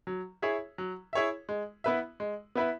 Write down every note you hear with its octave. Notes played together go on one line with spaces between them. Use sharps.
F#3
E4 G#4 C#5 E5
F#3
E4 G#4 C#5 E5
G#3
B3 E4 B4 E5
G#3
B3 E4 B4 E5